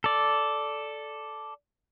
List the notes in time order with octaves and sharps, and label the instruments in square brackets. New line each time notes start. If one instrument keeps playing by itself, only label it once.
[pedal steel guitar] A4 D5